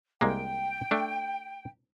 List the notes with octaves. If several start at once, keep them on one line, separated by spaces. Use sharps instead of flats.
C2 G#3 A#3 G5
A3 D4